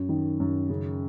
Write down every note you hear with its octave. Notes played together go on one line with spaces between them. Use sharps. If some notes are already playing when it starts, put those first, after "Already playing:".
Already playing: F#2
D#3
F#2
C#3